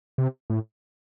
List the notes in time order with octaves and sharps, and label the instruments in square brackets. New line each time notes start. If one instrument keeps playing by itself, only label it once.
[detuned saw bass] C3
A2